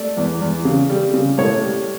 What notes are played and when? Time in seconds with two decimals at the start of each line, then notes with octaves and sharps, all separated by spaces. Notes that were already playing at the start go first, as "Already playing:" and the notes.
Already playing: A3 D5
0.17 E2
0.41 E2
0.65 C#3
0.90 G3
1.14 C#3
1.38 A2 C#5
1.62 G3